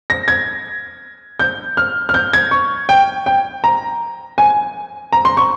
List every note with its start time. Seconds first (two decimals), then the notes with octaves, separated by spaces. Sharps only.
0.10 A#6
0.28 G#6
1.39 G6
1.77 F6
2.09 F6
2.14 G6
2.33 G#6
2.51 C#6
2.89 G5
3.26 G5
3.64 A#5
4.38 G#5
5.13 A#5
5.25 C6
5.37 C#6